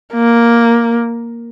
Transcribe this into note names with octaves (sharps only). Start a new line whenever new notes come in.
A#3